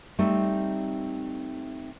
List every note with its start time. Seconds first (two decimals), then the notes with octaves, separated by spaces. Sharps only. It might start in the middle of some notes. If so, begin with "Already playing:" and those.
0.19 G3 A3 C4 D#4